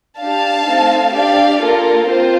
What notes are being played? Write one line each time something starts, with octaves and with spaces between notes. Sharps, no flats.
D4 G4 F5 A5
A3 C4 D#4 A4
D4 G4 D5 F5
A#3 F4 A4 A#4
C4 F4 C5